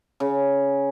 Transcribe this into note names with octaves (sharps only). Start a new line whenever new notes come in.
C#3